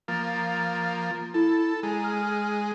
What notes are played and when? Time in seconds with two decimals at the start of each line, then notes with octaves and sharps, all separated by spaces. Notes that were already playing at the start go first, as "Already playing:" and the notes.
0.08 F3 A#3 A6
1.34 E4 A4
1.83 G#3 A#5
2.04 F6